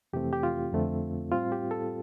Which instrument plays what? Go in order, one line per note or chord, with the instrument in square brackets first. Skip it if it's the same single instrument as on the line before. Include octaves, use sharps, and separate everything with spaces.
[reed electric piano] F2 C3 E3 A3 C4 G4
G4
F4
F2 D3 A3 C4
A2 G3 C4 F4
G4
A4